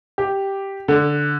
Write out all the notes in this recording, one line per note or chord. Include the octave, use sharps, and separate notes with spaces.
G4
D3